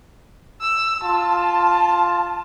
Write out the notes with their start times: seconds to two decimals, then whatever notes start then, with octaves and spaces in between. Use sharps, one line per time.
0.61 E6
1.03 F4 A5